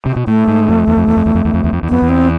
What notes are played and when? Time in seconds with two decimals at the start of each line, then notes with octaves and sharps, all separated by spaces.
0.06 C3
0.16 B2
0.27 A2 A3
0.48 G#2
0.68 F2
0.87 E2
0.97 F2
1.08 E2
1.17 F2
1.26 E2
1.35 F2
1.45 E2
1.54 F2
1.64 E2
1.73 F2
1.83 E2
1.89 F2 B3
2.02 E2
2.09 C4